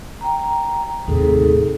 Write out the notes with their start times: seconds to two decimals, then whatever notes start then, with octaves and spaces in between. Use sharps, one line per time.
0.21 G5 A#5
1.08 D#2 A2 C3 D#4 G#4 A4